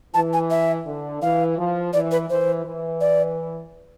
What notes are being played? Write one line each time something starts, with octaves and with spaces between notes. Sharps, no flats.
E3 A5
G#5
E5
D3
E3 F5
F3
E3 D5
B4
E3 C5
E3
D5